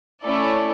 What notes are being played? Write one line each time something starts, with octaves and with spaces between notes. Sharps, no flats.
A3 C#4 E4 A4 D5